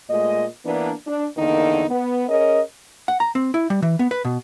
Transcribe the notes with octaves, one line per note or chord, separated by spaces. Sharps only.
A#2 G#3 A3 D#5
E3 A#3 B3 D4
D4
E2 D3 D#3 A#3 D#4
B3
C#4 G#4 A#4 D#5
F#5
A#5
C4
E4
G3
E3
B3
B4
B2